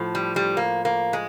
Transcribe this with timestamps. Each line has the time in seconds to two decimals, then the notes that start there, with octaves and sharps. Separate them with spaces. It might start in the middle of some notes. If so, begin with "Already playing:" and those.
Already playing: A2 F3
0.15 G3
0.36 G3
0.57 A#3
0.85 A#3
1.13 G#3